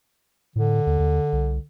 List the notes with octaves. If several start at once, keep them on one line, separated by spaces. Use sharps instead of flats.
A2 D3
D#2
D#2
C2